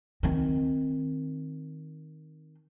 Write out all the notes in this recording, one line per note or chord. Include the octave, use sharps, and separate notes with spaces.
D#3 C4